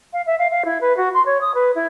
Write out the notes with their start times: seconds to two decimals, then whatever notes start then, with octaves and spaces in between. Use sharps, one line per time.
0.13 F5
0.26 E5
0.39 F5
0.51 F5
0.65 E4
0.81 B4
0.97 F#4
1.14 C6
1.26 C#5
1.41 D#6
1.55 B4
1.75 E4